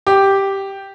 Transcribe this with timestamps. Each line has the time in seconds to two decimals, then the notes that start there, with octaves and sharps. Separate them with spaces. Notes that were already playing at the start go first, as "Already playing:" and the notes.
0.07 G4